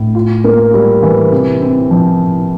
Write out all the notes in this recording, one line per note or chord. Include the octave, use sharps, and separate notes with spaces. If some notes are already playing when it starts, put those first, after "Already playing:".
Already playing: A2
F4
A#3
G3
E3
C3
C4
F3